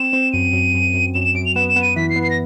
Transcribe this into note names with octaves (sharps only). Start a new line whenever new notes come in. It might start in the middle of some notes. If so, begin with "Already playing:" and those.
Already playing: C4 E7
C4
F#2 D#7
F#2
F#2
F#2
F#2 E7
E7
F#2 D7
F7
B3 E7
E7
B3
D#7
E3 B6
C7
B3
C7
A#6